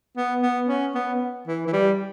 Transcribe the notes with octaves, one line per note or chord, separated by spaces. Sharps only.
B3
B3
C#4
B3
E3
E3
G3